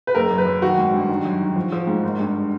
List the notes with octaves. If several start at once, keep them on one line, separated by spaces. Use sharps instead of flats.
B4
F#1 A#4
F#2
B4
F#2
D#3 F#4
G#1
G2
D#3
F#2
D#3
F3
F3
G#2
G#1
G2